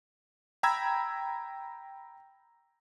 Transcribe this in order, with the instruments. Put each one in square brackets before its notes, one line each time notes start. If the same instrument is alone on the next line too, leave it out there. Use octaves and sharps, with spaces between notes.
[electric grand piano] G5 A#5 B5 E6 G#6